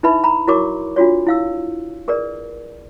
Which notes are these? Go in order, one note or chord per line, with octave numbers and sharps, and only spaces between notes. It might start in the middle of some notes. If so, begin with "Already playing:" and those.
D#4 E4 B4 E5 B5
A#5 B5
E4 F#4 A#4 C#5 C#6 D6
D4 F4 F#4 C#5
E4 F5 E6
G#4 A#4 B4 D5